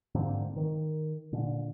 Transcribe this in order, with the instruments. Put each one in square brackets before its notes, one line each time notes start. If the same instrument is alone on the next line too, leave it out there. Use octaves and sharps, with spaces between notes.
[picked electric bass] G#2 D3 A#3 C4
D#3
A#2 D3